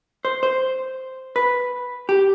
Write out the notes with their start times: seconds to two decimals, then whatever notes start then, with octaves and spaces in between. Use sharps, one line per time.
0.25 C5
0.43 C5
1.36 B4
2.09 G4